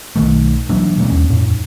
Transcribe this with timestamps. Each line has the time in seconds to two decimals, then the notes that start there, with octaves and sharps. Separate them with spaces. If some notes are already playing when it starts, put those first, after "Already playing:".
0.16 B1 E2 D#3 A3
0.69 E3 F#3 A#3 D4
0.98 B2 E3 G#3 A#3
1.10 D#2 C#4
1.30 F2 A2